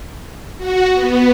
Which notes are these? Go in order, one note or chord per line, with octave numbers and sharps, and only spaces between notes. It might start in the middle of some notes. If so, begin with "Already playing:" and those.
F#4
B3